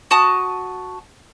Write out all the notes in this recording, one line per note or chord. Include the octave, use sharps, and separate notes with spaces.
F#4 A5 D#6